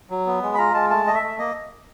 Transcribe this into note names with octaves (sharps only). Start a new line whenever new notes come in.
F#3
B3
G#3
B5
F4 A#5
G#3 A5
A3 A5
A3 D#5
E5
A3
A#3 D#5